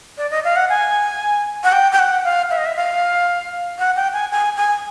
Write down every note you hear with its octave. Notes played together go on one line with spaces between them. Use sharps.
D5
D#5
F5
F#5
G#5
F#5
G5
G5
F#5
F5
E5
D#5
E5
F5
F#5
G5
G#5
G#5
G#5